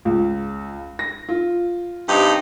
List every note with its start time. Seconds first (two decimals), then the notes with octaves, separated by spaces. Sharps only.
0.05 C#2
0.99 A#6
1.29 F4
2.08 G2 C3 D#4